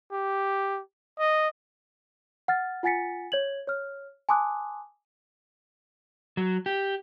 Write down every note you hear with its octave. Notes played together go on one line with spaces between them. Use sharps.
G4
D#5
F#5 F6 A6
F4 F#5 G#5 A6 B6 C#7
C#5 G#6 F#7
C#5 F6
G#5 A5 C6 D6 D#6 F#6
F#3
G4